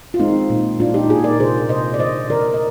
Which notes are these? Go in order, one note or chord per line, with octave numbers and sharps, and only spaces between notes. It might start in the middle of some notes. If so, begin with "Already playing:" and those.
F4
G#3 C4 D#4
A#2
A#2 D4 F4
D#4 G4
A#2 F4 G#4
A#4 D5
C3 G#4 C5
C3 C5 D#5
D5
D3 C5 D#5
D3 A#4 D5
D#5